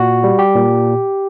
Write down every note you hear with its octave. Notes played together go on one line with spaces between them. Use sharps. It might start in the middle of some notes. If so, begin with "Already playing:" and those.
Already playing: A#2 F#4
G3
G4
A#2